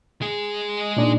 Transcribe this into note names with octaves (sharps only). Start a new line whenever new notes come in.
G#3 G#4
A#2 D4 D#4